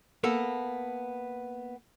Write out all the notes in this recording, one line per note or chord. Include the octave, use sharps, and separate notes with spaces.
A#3 B3 A4